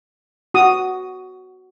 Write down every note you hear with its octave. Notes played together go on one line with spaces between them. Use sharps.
F#4 D#6